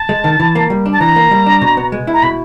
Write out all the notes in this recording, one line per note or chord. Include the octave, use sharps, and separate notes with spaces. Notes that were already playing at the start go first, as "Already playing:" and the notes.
Already playing: A5
G#3
D#3
E3
A#3
G3
D4
A5
E3 A#5
A#3
G3
D4
B2
B3
G#3
E4
A#5
B2 B5